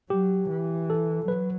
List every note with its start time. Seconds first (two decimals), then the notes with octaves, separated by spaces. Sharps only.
0.10 F#3 G4
0.50 E3
0.90 A4
1.28 F#3 B4